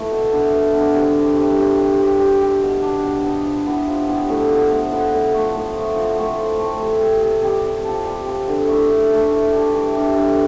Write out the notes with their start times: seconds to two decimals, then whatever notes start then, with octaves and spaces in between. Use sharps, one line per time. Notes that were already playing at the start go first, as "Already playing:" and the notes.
Already playing: E3 A3 E4
0.11 B2
0.32 B3 D4
0.52 B2
0.74 B3 D4
0.94 C3
1.15 G3 C4
1.36 C3
1.58 G3 C4
1.78 G3
1.99 C4 G4
2.19 G3
2.41 C4 G4
2.62 B2
2.82 B3 D4
3.03 B2
3.24 B3 D4
3.46 F3
3.67 B3 E4 G4
3.88 F3
4.08 B3 E4 G4
4.29 A2
4.51 F3 B3
4.71 A2
4.92 F3 B3
5.13 A2
5.34 F3 A3
5.55 A2
5.75 F3 A3
5.96 F3
6.18 A3 C4
6.38 F3
6.59 A3 C4
6.80 C3
7.00 G3 C4
7.22 C3
7.42 G3 C4
7.64 G3
7.85 C4 F4 A4
8.05 G3
8.26 C4 F4 A4
8.48 D3
8.68 A3 E4
8.90 D3
9.10 A3 E4
9.30 E3
9.52 G3 D4
9.73 E3
9.94 G3 D4
10.15 D3